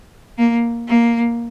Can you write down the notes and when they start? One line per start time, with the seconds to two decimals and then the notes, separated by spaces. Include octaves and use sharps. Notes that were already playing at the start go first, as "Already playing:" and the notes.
0.38 A#3
0.88 A#3